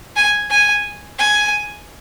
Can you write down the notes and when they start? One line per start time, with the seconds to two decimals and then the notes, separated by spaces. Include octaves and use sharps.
0.16 G#5
0.50 G#5
1.19 G#5